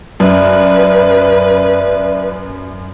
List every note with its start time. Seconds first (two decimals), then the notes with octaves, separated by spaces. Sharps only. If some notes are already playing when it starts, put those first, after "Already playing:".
0.20 F#2 B4 D5 E5